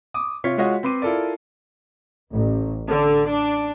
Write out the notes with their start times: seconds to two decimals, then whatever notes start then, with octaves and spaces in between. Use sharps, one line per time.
0.14 D6 D#6
0.44 C3 F4 C#5 B6 C#7
0.58 G#3 F4 F#4 C#5 D#5 F#5
0.83 C4 B4 C6 D6 D#7
1.02 E4 F4 A4 A#4 D5
2.31 A1
2.88 D3
3.30 D4